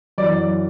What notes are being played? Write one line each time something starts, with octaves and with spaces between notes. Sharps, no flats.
F#2 E3 D5